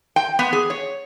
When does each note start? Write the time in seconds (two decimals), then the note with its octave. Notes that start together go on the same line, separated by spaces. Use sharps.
0.16 G5
0.39 B3
0.53 G#4
0.70 C#5